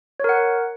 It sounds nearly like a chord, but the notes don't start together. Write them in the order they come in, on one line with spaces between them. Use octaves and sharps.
C#5 A#4 F#5